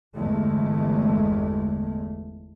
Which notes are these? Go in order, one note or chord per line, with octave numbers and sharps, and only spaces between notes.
G1 E2 G2 G#3 A3